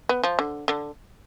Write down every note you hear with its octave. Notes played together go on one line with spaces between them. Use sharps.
B3
F3
D3
D3